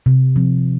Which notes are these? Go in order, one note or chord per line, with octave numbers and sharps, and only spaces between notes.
C3
F3 C4